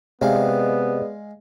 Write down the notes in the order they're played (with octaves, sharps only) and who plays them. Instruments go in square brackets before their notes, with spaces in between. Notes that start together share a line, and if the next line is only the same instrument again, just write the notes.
[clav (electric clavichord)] C3 [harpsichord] G#3 F5 [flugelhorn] B3 [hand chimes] G#4 D5 D#5